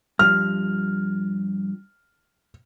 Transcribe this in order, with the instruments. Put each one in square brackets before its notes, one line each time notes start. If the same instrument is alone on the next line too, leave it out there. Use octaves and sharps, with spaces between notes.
[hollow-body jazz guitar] G2 F3 [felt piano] F6